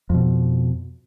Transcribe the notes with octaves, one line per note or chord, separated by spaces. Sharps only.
F2 B2